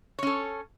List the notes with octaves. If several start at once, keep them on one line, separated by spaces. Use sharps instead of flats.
C#4 A4 C#5